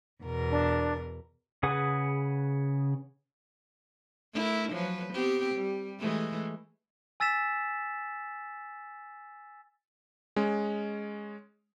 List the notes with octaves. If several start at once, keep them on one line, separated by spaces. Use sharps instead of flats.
E2 B2 A#4
D4
C#3 G#4 B4 F#5 D#6
A3 E4 A#4
F3 F#3 B4
B3 C4 G4
G3
E3 G#3 A3
G#5 E6 A6 B6 E7
G#3 C#4